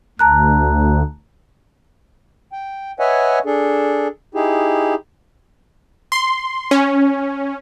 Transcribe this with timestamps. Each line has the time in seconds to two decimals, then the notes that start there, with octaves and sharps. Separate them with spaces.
0.19 D2 A5 A#5 F#6
2.53 G5
3.00 B4 C#5 D#5 E5 F#5 G#5
3.46 D4 G#4 A4
4.35 D#4 E4 G4 G#4
6.12 C6
6.71 C#4